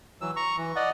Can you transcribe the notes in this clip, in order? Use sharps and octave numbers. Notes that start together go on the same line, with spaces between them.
E3 F#3 E6
A#5 C#6
E3
D5 D#5 F#5